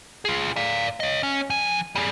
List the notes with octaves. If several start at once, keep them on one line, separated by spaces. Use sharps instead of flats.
F4 G#4
D5 F5
C#5 D#5
C#4
F3 G#5
G3 G#4